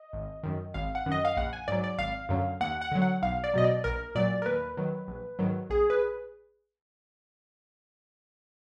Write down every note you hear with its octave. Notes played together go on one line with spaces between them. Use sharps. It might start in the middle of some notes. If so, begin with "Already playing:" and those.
Already playing: D#5
G#1
F#2 D#3
G#1 F5
F#5
F#2 D#3
D#5
F5
A#1 F#5
G#5
G#2 F#3 D5
D5
G#1 F5
F#2 D3 F#3
D#2 F#5
F#5
D3 F#3
F#5
B1 F5
D5
B2 F#3 D#5
D5
A#1 A#4
A#2 F#3 D5
A#4
D#2 B4
D#3 F#3
A#1
G#2 D#3 F#3
A#1 G#4
B4